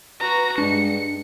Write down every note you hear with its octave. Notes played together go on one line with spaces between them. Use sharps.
F#4 B4 A#5
G2 G#3 D4 C#7